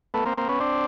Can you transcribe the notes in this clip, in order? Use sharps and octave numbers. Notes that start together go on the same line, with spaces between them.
A3 B3
A#3 C4
A#3 C4
B3 C#4
C4 D4